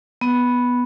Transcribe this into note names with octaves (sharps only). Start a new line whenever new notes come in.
B3